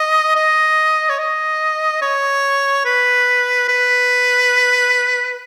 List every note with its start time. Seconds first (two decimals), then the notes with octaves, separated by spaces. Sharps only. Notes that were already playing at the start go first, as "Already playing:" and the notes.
Already playing: D#5
0.35 D#5
1.09 C#5
1.19 D#5
2.02 C#5
2.85 B4
3.68 B4